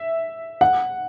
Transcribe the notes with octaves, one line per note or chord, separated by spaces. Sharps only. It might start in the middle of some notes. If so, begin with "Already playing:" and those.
Already playing: E5
F#5